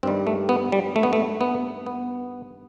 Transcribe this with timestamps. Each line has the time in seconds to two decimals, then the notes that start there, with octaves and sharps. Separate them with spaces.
0.03 G2 D#3 G3 C4
0.27 A3
0.49 B3
0.72 G3
0.96 A3
1.03 B3
1.13 A3
1.41 B3
1.86 B3